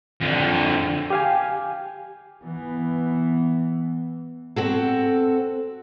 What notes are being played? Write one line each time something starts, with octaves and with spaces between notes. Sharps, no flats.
F2 D3
G4 F5 G#5
E3 B3
C4 F#4 A4